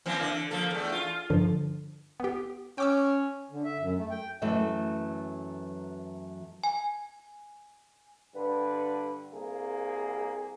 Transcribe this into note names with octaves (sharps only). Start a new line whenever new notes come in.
E3 A#3 C4
D3
F3 A#3 A4
E2 A3
F4
G2 D3 F3
B3 G4
C#4 G5 D6 E6
D3
E5
F#2
A3
G5
F#2 E3 F#3 A3 B4 E5
G#5
G2 D3 B4
C2 A#3 G#4